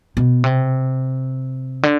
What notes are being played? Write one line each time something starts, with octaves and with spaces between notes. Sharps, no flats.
B2
C3
D3